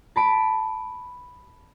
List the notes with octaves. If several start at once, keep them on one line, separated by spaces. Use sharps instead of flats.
A5 B5 D7